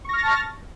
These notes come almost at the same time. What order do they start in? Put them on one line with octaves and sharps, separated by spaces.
C#6 A#6 F6 A6 A5